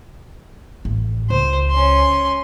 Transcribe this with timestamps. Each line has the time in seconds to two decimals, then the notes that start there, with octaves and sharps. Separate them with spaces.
0.85 A1
1.30 C#2 C5
1.71 C#4 C6